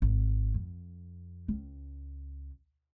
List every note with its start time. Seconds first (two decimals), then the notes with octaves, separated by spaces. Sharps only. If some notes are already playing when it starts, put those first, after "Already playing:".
0.02 G#1
0.54 F2
1.48 C#2